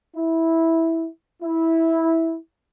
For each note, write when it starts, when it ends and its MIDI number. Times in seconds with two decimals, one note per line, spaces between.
0.16 1.08 64
1.43 2.37 64